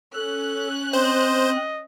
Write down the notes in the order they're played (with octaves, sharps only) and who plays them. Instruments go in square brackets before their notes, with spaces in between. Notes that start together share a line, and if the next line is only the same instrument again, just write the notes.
[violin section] C#4 F#6 [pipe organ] A4
[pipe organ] C4 [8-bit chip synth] C5 [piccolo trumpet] D#5